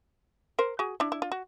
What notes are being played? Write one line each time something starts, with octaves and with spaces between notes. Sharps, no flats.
A#4 C5
F#4 G#4
D4 E4
E4
F4
F#4